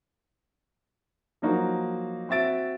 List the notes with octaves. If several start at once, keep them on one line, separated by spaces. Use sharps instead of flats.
F3 F#3 A#3 D#4 F#4
C4 F#4 E5 A6 D7